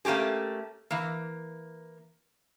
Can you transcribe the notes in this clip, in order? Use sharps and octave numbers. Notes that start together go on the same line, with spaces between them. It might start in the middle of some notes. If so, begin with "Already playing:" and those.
A3 A#3 C#4 G4 G#4
E3 A#3